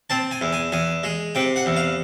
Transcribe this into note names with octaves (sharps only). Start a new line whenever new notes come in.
C4 A5
G#5
E2
G#5
E2 G#5
G#3
C3 G5
F#5
E2
F5